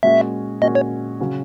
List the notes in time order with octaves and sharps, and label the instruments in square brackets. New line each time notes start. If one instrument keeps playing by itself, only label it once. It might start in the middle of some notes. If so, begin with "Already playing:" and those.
[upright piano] A#2 G#3 C#4 F#4 [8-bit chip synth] E5
[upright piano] A#2 G#3 C#4 F#4 [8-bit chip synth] D#5
[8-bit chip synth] C#5
[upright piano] C#3 F#3 C#4